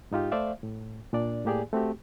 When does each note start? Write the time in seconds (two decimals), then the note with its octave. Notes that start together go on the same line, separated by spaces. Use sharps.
0.11 G#2 D#4 F4 G4
0.32 A3 C5 D5 E5 F5
0.63 A2
1.13 A#2 D4 D5
1.45 A2 A#3 G4 G#4 D5 G#5
1.73 A3 C4 F#4 G4